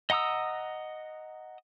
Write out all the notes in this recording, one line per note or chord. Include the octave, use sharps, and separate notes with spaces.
D#5 F#5 A#5 D#6 E6